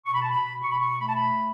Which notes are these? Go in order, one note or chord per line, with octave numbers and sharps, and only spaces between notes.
B2 C#6
B5
A5
B5
B2
C#6
B2 B5
C#6
A3 B5
A5
B5
B2